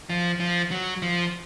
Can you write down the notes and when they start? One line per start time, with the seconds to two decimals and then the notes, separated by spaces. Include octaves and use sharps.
0.10 F3
0.40 F3
0.71 F#3
1.02 F3